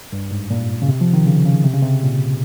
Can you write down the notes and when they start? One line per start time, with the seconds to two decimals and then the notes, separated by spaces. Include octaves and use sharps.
0.13 G2
0.31 G#2
0.50 A#2
0.82 C#3
0.88 C3
1.01 F3
1.14 D#3
1.26 C#3
1.46 C#3
1.64 C3
1.73 C#3
1.82 C3
2.03 A#2